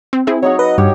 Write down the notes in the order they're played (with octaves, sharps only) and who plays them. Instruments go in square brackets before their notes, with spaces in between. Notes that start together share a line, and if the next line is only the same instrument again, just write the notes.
[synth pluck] C4
[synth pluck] C4 G#4 E5 [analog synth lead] E4
[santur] F#3 D#4 F#5 [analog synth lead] C#5
[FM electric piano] B4 [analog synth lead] D#5
[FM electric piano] G2 [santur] G4 [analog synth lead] C#5